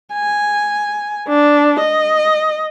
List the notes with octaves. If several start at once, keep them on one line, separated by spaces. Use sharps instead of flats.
G#5
D4
D#5